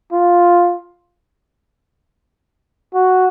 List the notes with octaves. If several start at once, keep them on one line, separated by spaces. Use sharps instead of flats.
F4
F#4